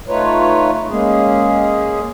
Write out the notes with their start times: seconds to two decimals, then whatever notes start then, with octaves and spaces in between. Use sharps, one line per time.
0.08 A3 D#4 F4 B4 C#5
0.89 G#3 A#3 C#4 G#4